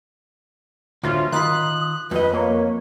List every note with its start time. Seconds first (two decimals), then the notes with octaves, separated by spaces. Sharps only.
1.03 D2 A2 E3 F4
1.32 D#3 F4 B5 D#6 F#6
2.11 F2 B4 D#5
2.33 A#3 C#5